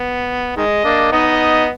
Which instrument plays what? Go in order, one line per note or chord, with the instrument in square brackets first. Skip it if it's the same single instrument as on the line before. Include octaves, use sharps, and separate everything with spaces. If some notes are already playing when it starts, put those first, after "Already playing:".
Already playing: [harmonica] B3
[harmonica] D#3 G#3 [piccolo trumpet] D#5
[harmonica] A#3 D4
[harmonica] B3 D#4 [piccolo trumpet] D#5